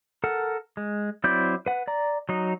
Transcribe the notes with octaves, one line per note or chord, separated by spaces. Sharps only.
A4 A#4 F#5
G#3
F#3 C4 E4 D5 G6
B4 F#5
D5 A#5
F#3 D#4